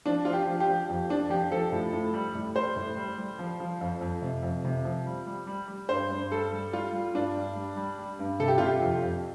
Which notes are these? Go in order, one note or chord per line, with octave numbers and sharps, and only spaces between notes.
F3 D4
F3 F4
G4
F3
G4
F3
F2
F3 D4
F3 G4
F3 A4
A2
A2
G3
A2
G3 C5
A2
G3
G3
F3
F3
F2
F2
C3
F2
C3
F3
G3
G3
G3
G3
G2 C5
G2
G3 A4
G3
G3 F4
G3
G2 D4
G3
G3
G3
G3
G2
C3 A4
G4
C3 F4
G4
F2
F2